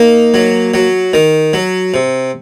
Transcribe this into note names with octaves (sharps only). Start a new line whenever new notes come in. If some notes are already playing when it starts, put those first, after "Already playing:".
Already playing: A#3 D#4
F#3
F#3
D#3
F#3
C3